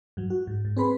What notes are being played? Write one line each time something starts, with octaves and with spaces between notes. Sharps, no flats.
G2 F#3
F#4
G#2
G#2
C4 G#4 B4 B5 C6